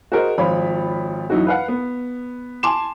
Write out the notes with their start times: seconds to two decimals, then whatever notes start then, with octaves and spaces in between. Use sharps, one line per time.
0.12 F#4 G#4 A#4 C5 D#5
0.38 G#1 F3 F4 C#5 B5
1.30 F#2 E3 D#4 E4 F#4
1.47 B4 F5 F#5
1.68 B3
2.63 G#5 A5 C6 D6 E7